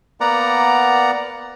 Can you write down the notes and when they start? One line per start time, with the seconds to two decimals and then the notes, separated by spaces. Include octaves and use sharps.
0.21 A#3 B3 D5 F#5 A#5